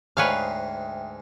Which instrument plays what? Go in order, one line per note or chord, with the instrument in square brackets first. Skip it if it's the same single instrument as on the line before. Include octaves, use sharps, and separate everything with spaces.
[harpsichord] D2 G#2 G#4 [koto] B4 C#5 F5 [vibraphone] E5 G5